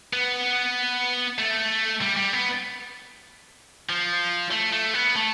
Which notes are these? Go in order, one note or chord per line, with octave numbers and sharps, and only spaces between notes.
B3
A3
G3
G3
B3
F3
A3
A3
B3
A3